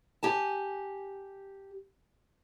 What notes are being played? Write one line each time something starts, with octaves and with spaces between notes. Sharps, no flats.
G4 G#5 A5